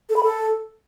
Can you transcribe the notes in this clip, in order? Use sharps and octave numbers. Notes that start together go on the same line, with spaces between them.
A4
B5
A4